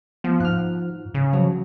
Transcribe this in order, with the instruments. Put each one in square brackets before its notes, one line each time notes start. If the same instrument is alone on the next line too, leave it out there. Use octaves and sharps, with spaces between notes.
[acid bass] F3 [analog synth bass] B3
[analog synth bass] G#2 [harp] F6 F#6
[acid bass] C#3
[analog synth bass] F3 [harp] F#3